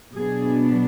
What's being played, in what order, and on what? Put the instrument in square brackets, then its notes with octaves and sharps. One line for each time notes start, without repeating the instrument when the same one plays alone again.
[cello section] B2 F#3 B3 D4 G#4